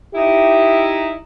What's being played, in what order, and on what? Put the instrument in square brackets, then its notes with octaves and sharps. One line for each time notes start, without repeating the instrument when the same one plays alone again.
[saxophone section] D#4 E4 [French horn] G4